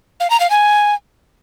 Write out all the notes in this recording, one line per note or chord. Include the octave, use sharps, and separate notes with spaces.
F5
A#5
F5
G#5